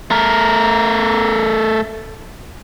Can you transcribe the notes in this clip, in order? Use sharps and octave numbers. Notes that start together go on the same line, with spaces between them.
A3 A#4